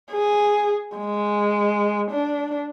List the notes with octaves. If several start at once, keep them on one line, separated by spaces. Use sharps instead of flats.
G#4
G#3
D4